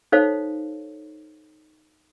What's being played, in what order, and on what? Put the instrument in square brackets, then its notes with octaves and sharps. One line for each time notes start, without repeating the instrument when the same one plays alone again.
[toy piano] D#4 A4 C5 C#5 F5